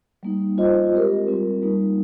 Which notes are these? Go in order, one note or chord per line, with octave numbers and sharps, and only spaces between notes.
G3 A#3 D#4
F4 C5 D#5
G#3 C4 G4 A#4
G3 C4 F4 A#4
G3 A#3 D#4